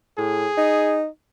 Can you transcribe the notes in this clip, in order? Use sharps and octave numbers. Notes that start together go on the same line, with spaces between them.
A2 G#4
D#4